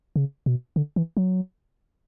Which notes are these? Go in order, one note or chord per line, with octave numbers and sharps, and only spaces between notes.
C#3
B2
D3
E3
F#3